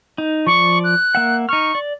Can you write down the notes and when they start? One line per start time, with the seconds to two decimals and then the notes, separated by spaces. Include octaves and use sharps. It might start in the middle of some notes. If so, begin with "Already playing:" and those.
0.18 D#4
0.47 F3 D5 C#6 D6
0.84 F#6
1.15 A#3 E5 F#5
1.49 D#4 C#6 F6
1.75 D5